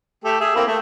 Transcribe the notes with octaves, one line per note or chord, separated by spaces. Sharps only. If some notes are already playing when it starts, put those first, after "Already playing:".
A3 G4 A4
G#4 E5
A#3 C4 E4
A3